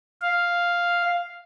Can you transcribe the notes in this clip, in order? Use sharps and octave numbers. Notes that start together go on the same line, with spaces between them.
F5